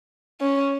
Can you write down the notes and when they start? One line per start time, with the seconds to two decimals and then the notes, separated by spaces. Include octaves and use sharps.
0.41 C#4